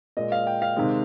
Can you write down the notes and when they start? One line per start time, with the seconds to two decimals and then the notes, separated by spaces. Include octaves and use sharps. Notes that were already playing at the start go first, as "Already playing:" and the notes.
0.17 A#2 G#3 D#5
0.32 F5
0.47 G5
0.62 F5
0.77 C3 D#3 G#3